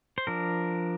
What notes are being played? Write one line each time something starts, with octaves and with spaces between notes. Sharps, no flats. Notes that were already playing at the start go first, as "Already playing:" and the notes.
C5
F3 D4 A#4